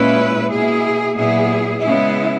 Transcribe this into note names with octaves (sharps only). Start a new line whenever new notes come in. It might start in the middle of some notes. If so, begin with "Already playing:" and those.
Already playing: A#2 G#3 C#4 E4 B4
B2 A#3 E4 G#4
A#2 F#3 B3 E4 G#4
C#3 G#3 B3 E4